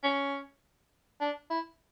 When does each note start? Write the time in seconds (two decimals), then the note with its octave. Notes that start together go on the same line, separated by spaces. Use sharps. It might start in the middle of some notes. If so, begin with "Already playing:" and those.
0.03 C#4
1.21 D4
1.50 E4